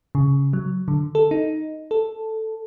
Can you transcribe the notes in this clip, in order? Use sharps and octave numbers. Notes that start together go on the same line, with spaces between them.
C#3
F#3
D3
A4
D#4
A4